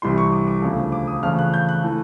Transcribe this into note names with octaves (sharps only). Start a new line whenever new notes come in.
C2 C3 E3 C6
C#6
D6
D6
D2 C#3 F3
D6
D#6
E2 C#3 F3 A3 F6
F#6
G6
F#6
E3 A3